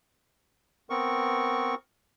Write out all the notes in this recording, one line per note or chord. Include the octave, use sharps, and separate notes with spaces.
B3 C4 A#4 C#6